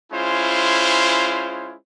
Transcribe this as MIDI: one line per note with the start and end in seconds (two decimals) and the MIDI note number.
0.13 1.76 56
0.13 1.76 61
0.13 1.76 64
0.13 1.76 65
0.13 1.76 72